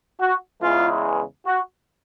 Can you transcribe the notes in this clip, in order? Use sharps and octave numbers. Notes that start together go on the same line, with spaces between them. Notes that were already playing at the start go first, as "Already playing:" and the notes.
F#4
E2 C#3 E3 G#3 F4
F#4